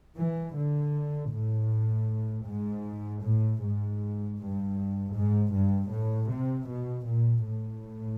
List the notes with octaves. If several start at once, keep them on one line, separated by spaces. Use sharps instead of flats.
E3
D3
A2
G#2
A2
G#2
G2
G#2
G2
A2
C3
B2
A#2
A2